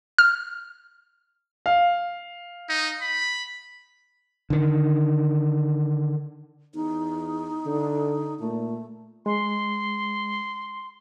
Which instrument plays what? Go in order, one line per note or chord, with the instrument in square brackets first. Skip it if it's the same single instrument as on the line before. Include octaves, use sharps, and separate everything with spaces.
[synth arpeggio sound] F6
[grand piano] F5
[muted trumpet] D#4
B5
[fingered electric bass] D3 D#3
[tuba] E2 [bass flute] D#4
[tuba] D3
[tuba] A#2 [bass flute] A3
[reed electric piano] G#3 [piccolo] C6